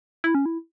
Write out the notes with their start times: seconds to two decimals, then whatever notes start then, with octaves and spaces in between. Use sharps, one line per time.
0.24 E4
0.35 C#4
0.46 E4